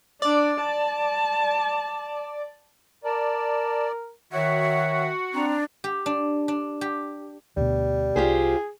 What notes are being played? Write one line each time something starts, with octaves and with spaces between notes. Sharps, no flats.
D4 D5
A5
A#4 D5 A5
D#3 F#4 C#5 E5 F#5
C4 D4 A#5
G4
D4
D4
G4
D2 B2 G3
C2 F4 G4 G#4 C5